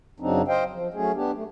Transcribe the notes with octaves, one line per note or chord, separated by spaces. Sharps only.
F#2 C#3 F#3 C4 D4 D#4
C5 D#5 F5 G5
F3
F#3 A3 C#4 G#4
B3 D4 G4
A3